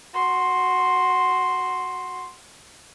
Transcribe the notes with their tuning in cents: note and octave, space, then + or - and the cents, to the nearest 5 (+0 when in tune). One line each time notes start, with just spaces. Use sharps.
F#4 +0 C6 +5